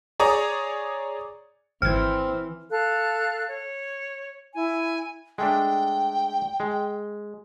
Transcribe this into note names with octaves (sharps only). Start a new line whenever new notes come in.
G#4 C#5 D5 G#5 A#5 D#6
G#1 E3 C4 F6 G#6
A4 F5 F#6
C#5
E4 G#5
G#3 A3 D4 G5
G#3